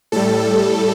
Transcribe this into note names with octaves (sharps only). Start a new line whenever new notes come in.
A2 G3 A4